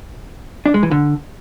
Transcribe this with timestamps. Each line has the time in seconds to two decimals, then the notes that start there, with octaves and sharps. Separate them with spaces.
0.66 D4
0.74 G#3
0.83 E3
0.91 D3